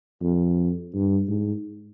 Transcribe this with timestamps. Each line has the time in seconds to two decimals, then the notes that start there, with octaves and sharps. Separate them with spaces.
0.22 F2
0.94 G2
1.29 G#2